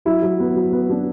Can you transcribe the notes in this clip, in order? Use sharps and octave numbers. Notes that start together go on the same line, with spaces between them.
F#3 E4
F#3
B3
F#3
B3
D4